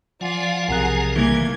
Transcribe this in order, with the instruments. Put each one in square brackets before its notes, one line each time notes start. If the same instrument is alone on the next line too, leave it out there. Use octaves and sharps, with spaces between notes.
[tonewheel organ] F3 F#5 G#5 [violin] F4 D5
[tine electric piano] B1 C3 F#6 [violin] G#4 A#4
[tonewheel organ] C#3 G3 [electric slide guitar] E3 A3 A#3 [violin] G#6